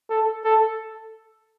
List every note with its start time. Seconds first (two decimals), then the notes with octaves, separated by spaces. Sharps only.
0.10 A4
0.45 A4